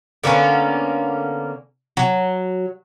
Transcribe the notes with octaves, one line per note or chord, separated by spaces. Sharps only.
D3 A#3 B3 C#4
F#3